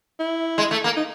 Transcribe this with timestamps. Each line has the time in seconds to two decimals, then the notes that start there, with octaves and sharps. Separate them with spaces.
0.19 E4
0.58 G#3
0.71 A3
0.84 A#3
0.97 D#4